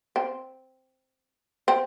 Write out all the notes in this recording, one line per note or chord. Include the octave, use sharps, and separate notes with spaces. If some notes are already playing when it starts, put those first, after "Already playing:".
C4
C4